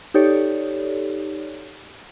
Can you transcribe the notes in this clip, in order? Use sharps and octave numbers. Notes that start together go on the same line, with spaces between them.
D#4 G4 A4 C#5 D5